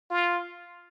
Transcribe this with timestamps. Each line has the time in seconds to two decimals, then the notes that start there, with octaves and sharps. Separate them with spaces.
0.11 F4